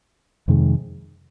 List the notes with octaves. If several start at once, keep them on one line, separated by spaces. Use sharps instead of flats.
F2 C3 D#3 G#3